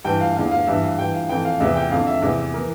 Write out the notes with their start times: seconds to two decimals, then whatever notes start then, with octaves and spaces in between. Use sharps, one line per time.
0.05 G2 E3 G5
0.21 F5
0.36 E2 D3 F5
0.51 F5
0.67 G2 E3 E5
0.83 F5
0.99 G2 E3 G5
1.14 F5
1.29 F2 E3 G5
1.45 F5
1.60 E2 C3 E3 E5
1.76 G5
1.91 F2 D3 F5
2.07 E5
2.22 E2 C3 E3
2.54 E3 A#4